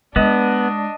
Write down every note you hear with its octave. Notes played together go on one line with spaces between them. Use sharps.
G#3 B3 D4 D#5